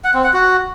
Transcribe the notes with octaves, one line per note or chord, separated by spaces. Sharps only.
F#5
C4
F#5
F#4